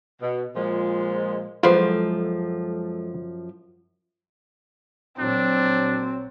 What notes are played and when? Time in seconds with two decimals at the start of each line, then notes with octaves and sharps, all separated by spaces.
0.22 B2
0.56 A#2 F3 G#3
1.63 F#2 F3 G#3 F4 A4 B4 C5
5.19 A#1 A#2 F#3 C4 D4